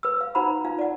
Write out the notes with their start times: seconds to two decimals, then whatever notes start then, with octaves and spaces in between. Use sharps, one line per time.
0.03 B4 E6
0.21 F5
0.35 D#4 F#4 C5 F#5 A#5 B5
0.65 D#4 F4 F5
0.79 D5 F#5